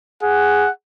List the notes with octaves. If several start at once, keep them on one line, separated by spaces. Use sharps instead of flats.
G#4 F#5